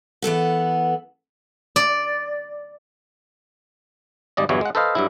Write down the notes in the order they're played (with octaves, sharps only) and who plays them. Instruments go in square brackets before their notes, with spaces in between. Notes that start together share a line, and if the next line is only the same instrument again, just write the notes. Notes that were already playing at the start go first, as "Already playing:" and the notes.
[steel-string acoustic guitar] E3 B3 A4 F#5
[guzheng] D5
[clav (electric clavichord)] G#1 G3 D5 D#5
G1 E2 G2 E3 F#3 C#5
G#3 F#5
A4 B4 C5 D#5 F5
G2 F#3 E4